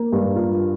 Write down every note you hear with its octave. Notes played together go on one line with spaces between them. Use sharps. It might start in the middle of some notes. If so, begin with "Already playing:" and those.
Already playing: A#3
G2
F4